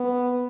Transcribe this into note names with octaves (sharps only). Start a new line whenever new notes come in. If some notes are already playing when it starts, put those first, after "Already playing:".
Already playing: B3